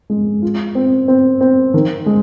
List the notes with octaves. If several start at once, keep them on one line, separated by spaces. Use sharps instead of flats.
G#3
F4
C4
C4
C4
D#3
G#3